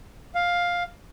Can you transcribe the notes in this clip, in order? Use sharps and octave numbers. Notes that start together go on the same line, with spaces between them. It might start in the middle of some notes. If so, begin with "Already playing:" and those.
F5